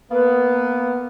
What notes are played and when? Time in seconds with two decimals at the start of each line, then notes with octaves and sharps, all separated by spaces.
0.11 A#3 B3